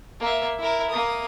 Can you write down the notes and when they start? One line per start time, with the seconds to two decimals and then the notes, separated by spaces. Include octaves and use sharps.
0.20 A#3 E5
0.59 E4 A#4
0.90 A#3 D#6